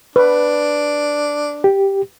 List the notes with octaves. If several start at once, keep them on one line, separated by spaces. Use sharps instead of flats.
D4 B4
G4